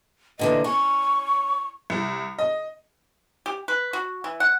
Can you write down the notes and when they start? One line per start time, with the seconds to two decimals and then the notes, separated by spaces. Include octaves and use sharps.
0.39 A#2 D3 E3 D#5
0.64 C#4 C#6
1.90 C2
2.38 D#5
3.46 G4
3.68 B4
3.93 F#4
4.24 E3
4.40 F#5